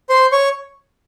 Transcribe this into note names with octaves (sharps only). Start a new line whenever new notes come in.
C5 C6
C#5 C#6